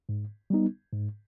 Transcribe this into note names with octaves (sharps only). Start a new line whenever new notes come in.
G#2
G3 B3 D#4
G#2